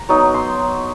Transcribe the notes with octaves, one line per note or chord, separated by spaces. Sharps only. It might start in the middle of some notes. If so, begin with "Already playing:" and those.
Already playing: A#5
F#3 B3 D#4
C6